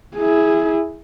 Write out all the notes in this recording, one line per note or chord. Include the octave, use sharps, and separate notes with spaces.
E4 G#4